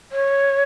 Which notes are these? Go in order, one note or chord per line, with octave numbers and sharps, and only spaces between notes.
C#5